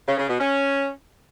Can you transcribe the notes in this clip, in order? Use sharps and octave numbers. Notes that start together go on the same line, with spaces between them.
C#3
C#3
B2
C#4